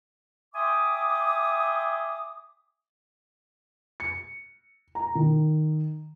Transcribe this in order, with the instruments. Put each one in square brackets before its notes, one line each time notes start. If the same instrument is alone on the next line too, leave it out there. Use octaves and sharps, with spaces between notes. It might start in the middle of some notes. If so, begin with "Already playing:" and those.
[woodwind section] E5 G5 G#5 C6 D6 D#6
[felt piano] C#7
A#5
D#3